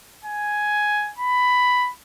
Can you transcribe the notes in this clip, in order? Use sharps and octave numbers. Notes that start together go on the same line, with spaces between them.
G#5
B5